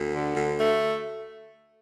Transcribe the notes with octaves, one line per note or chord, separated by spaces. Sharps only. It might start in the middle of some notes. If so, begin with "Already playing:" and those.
Already playing: D2
D3
D2
A3